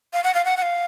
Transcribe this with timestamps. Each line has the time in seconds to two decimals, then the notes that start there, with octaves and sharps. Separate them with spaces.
0.13 F5
0.24 F#5
0.35 F5
0.45 F#5
0.57 F#5
0.62 F5